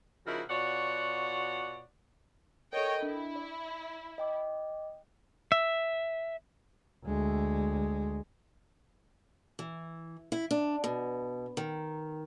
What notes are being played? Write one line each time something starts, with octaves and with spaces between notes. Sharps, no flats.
C#3 F3 D#4 E4 F#4 A#4
B2 F4 F#4 C#5 D5 F#5
A4 A#4 C#5 D#5 G5
D4 E4
D5
D#5 G5 D6
E5
D2 G#3
E3
E4
D4
B2
D#3